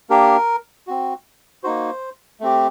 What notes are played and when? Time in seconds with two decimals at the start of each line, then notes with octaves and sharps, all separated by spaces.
0.10 A#3 D4 G4 A#4
0.87 C4 F#4
1.64 A#3 D#4 F#4 C5
2.40 A3 C4 G4